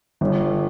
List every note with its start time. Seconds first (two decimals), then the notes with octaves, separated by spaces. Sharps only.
0.21 G1